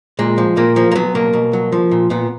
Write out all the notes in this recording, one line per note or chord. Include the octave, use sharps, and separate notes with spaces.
A#2 G#3
F3
A#2 A#3
F3 A#3
A#3
F#3 B3
B2 A#3
B2
F#3
F3
A#2
A#2 B3